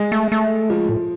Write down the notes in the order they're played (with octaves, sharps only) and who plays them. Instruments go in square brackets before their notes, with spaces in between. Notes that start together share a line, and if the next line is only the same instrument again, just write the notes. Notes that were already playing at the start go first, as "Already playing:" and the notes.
Already playing: [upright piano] G#3
[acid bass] A3
A3
[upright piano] F3 [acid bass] G#3
[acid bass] A2